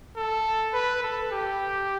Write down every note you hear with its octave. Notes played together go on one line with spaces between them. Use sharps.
A4
B4
A4
G4